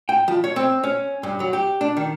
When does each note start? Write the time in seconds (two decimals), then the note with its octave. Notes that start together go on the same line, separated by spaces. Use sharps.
0.09 G5
0.28 F3
0.44 C#5
0.56 C4
0.84 C#4
1.23 G2
1.40 F#3
1.53 G4
1.81 D4
1.97 D#3